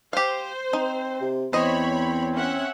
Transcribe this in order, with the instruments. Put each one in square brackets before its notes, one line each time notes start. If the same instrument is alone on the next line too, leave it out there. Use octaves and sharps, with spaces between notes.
[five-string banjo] G4 F5 [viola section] C5
[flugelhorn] C4 [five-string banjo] D#4
[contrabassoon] C3
[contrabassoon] E2 [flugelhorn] C4 [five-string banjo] C5 D#5 [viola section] C#5 B5
[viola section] C#4 E5 F#5